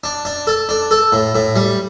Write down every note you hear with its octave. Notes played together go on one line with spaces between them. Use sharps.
D4
D4
A4
D4
A4
A2
A2
G3